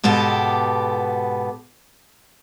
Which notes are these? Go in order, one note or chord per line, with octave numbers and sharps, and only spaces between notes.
G#2 B2 B3 G4 A4